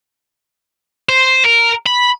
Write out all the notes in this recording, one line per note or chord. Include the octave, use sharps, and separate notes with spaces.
C5
A#4
B5